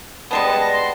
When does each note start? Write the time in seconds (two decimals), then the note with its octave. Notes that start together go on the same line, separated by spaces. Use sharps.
0.31 G3 G#3 B3 A5
0.61 A#6
0.73 C6